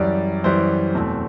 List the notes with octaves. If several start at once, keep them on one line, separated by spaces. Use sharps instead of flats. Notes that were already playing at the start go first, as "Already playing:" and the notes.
Already playing: F#2 E3 G3 D5
F#2 E3 G3 C5
E2 B2 A3 C4